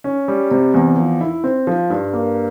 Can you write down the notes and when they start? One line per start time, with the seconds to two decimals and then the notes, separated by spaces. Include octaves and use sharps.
0.04 C#4
0.28 G3
0.51 C3
0.74 E2
0.97 F3
1.21 E4
1.44 C4
1.67 F3
1.90 G2
2.13 A#3